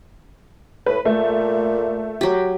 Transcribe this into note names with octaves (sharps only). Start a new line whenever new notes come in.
A2 B4
A#2 A3
F#3 G4